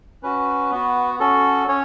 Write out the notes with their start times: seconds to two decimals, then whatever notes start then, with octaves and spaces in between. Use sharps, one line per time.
0.23 C#4 F#4 B4
0.71 B3 F#4
1.20 C#4 F#4 A4
1.68 C#4 C#5